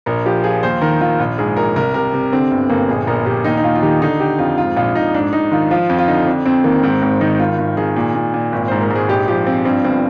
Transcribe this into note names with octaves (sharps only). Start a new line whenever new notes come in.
A#1 A#4
F3 G4
F3 G#4
D#2 C5
D#3 A#4
D#3 F4
A#1 F4
G#2 G#4
A#1 A#4
C2 A#4
C3 A#4
C3
D3 C4
G1
G1 A#3
A#1 G#4
A#1 A#4
A#1 G4
D#2 D#4
D#4
D#2 F4
F4
D#3 G4
D3 D#4
D3 G4
F2 F4
G#2 F4
A#1 F4
A#1 D#4
G#2 D4
G#2 D#4
D#3 F4
F3 F4
F2
F4
D3 D#4
F2 D4
F2 C4
D#3 A#3
G#2 C4
G#1 C4
D#3 D#4
G#1 F4
G#1
D#3 G#4
A#2
A#2
A#2
G#1
G#2 C5
A#4
G#2
G#4
A#1 G4
F3 G4
F3 C4
G2 C4
G1 C4